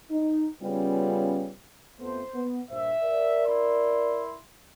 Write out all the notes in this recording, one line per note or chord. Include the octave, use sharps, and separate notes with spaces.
D#4
C#3 G3 B3 C#4 F4
F2 A3 B3 C5
B3
G2 A#2 C5 E5
A#4 D5
E4 C6